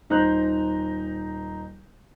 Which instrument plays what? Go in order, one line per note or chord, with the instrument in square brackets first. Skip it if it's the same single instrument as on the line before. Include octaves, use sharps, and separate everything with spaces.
[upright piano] D#1 D#4 C5 A#5 F#6 G6